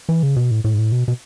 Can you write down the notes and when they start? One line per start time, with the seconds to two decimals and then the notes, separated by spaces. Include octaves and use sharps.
0.09 E3
0.23 C#3
0.36 B2
0.51 A2
0.64 A2
0.74 G#2
0.78 A2
0.92 B2
1.08 B2